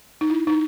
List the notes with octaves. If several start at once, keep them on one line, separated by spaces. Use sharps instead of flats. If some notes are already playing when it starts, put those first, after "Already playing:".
D#4
E4
D#4